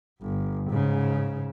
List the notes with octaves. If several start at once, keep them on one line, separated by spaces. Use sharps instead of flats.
G1
G#2 C#3